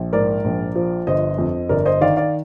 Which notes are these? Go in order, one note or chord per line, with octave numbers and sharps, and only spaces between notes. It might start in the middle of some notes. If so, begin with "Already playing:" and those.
Already playing: A#1
G#2 A#4 D5
A#1
F3
G1 C5 D#5
F2
G1 A#4 D5
C5 D#5
D#3 D5 F5
D5 F5